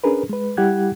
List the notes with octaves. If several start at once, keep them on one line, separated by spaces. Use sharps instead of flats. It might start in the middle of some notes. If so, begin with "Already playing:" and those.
C#4 D4 G#4 A#4 B4
G#3 B4
G3 E4 G4 F#5 F#6 G#6